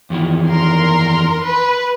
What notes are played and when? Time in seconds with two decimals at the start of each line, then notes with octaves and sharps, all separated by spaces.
0.10 F2 D#3 E3
0.50 A#4 C6
1.45 B4